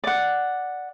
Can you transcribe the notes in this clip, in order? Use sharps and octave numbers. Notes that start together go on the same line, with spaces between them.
D5 F#5